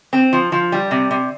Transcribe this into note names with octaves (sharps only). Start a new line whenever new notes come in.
C4
F3
F3
G3
C3
C3